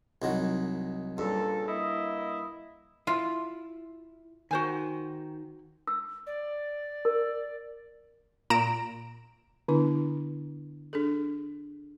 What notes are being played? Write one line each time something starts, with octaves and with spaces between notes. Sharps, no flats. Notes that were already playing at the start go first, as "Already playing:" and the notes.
C2 D#3 F#3
G2 A#2 C#3 A4
A#3 E4 D#5
E4 F4
D#3 F#4 C5 G#5
E6
D5
A#4
A#2 A#5 D7 E7
D3 B3 D4 E4
D4 G#4 A4